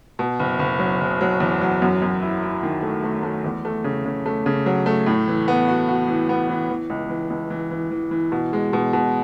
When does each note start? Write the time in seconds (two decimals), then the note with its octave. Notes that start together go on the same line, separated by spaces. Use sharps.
0.19 B2
0.39 F#1
0.59 F#1
0.79 F#3
1.00 F#1
1.21 F#3
1.40 E2
1.61 F#3
1.82 F#2
2.02 F#2
2.22 E4
2.43 E4
2.63 D#3
2.82 A3
3.04 A3
3.23 A3
3.44 E2
3.65 A3
3.84 C#3
4.06 C#3
4.26 A3
4.46 C#3
4.66 F#3
4.86 A3
5.06 A2
5.28 E3
5.48 B3
5.68 F#4
5.88 F#4
6.08 E3
6.29 B3
6.49 E3
6.70 E3
6.90 C#2
7.09 E3
7.30 C#2
7.50 E3
7.71 E3
7.91 E3
8.11 E3
8.32 B2
8.53 G#3
8.73 B2
8.93 B2